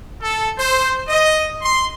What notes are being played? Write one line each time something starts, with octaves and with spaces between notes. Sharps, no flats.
A4
C5
D#5
C6